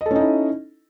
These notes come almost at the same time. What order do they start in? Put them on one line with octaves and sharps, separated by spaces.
D#5 A4 C#4 D#4 E4